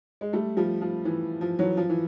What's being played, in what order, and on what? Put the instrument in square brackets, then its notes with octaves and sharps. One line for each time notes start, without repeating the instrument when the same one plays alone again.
[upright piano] G#3
G3 A3
F3 G3
F3
E3
F3
E3 F#3
F3
E3